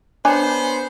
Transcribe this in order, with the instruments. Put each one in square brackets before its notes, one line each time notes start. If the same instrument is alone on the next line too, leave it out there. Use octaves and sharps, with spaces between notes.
[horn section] B3 C5 [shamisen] D4 C#5 G#5